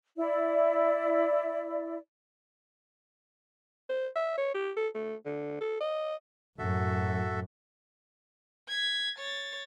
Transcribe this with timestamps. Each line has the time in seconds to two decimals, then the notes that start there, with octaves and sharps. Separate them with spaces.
0.17 E4 D5
3.89 C5
4.16 E5
4.37 C#5
4.54 G4
4.77 A4
4.95 A3
5.25 D3
5.61 A4
5.81 D#5
6.59 F#2 A2 F#4 A4 E5
8.68 G#6 B6
9.16 C#5 A6